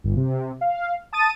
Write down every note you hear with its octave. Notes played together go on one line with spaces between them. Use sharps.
G1
C3
F5
A5 D#6 A6 D#7